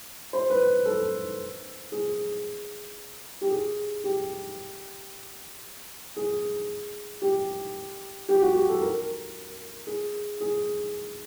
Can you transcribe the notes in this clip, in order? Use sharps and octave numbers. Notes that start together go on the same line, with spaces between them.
C5
B4
A4
G#4
G4
G#4
G4
G#4
G4
G4
F#4
G4
A4
A#4
G#4
G#4